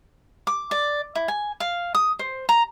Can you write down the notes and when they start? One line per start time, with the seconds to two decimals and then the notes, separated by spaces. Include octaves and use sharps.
0.47 D6
0.71 D5
1.15 E4
1.28 G#5
1.60 F5
1.95 D#6
2.19 C5
2.49 A#5